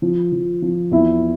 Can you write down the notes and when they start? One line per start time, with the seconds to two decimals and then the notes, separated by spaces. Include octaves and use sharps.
0.02 F3
0.32 F3
0.62 F3
0.91 E2 E4